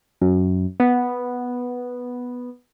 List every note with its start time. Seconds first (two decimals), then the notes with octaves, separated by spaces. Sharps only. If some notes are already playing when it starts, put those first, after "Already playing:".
0.21 F#2
0.80 B3